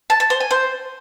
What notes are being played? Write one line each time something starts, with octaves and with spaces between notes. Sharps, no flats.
A5
A5
C5
G#5
C5